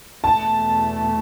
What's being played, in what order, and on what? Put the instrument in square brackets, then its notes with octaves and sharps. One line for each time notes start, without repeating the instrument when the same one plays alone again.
[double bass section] E2 B2 A3 [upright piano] A5